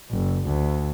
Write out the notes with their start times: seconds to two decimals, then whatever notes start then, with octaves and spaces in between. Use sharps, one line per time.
0.12 F#1
0.47 D2